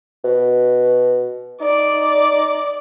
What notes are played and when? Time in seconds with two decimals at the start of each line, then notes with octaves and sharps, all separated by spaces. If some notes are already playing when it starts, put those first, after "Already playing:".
0.25 B2
1.61 D#4 D5